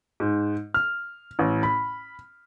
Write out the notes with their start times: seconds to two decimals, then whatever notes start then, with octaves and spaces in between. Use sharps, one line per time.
0.20 G#2
0.74 F6
1.39 A1
1.63 B5